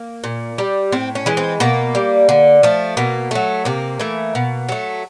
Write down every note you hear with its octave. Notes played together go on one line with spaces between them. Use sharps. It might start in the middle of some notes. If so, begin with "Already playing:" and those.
Already playing: A#3
A#2
G3
A2 C4
C#4
E3 G#3
C4
B2 A#3
G3
D3
F3 A3
B2 A#3
F#3 A3
C3 A#3
E3 A3
B2
F#3 A3